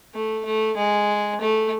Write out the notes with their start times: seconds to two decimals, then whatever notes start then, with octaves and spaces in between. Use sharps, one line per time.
0.14 A3
0.45 A3
0.77 G#3
1.41 A3